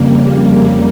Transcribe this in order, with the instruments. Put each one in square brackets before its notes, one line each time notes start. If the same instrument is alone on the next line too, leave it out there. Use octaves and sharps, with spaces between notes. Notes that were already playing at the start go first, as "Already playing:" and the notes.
Already playing: [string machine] F2 C#3 G3 A#3